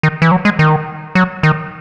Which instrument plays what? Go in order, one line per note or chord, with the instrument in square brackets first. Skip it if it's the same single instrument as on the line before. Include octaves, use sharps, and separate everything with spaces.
[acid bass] D#3
E3
F#3
G#3
D#3
F#3
D#3